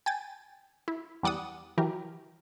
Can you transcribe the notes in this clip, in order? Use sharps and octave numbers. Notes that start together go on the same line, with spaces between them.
G5 G#5 A6
E4
E2 G3 D5 F#5 D#6
E3 F#3 G4 A#4